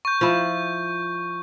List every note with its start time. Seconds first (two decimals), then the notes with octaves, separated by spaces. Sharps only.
0.05 C#6 G6
0.21 F3 E4